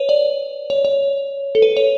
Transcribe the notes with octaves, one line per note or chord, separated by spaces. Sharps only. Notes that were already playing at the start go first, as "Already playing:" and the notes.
Already playing: B4 C#5
D5
C#5
C#5
A4
B4
C#5